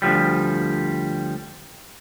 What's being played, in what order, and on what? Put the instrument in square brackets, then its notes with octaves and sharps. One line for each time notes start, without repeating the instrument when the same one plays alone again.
[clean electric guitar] D2 G#2 F3 G3